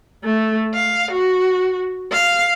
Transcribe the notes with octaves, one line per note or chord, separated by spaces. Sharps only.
A3
F5
F#4
F5